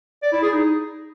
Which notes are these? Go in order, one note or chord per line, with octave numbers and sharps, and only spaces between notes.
D5
E4
G#4
D#4